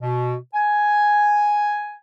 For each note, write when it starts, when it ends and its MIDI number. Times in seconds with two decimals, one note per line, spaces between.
0.02 0.35 47
0.54 1.99 80